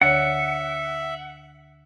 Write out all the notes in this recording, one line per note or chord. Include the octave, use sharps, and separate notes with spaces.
D2 D3 C#5 E5 F#5